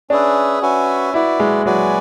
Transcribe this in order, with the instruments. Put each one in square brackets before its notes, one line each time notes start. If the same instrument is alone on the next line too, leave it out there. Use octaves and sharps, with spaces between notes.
[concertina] C#4 G#4 B4 E5 [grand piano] D4
[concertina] C#4 F#4 B4 E5 G#5
[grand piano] E4 [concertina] F#4 B4 D5
[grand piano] G#3
[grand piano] F#3 [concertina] F#4 B4 D5 G#5